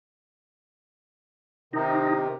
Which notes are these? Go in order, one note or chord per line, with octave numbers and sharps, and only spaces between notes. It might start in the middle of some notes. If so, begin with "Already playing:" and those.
C3 D#3 D#4